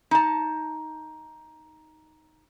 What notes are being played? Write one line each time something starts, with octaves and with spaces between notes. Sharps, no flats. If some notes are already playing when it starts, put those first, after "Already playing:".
D#4 A5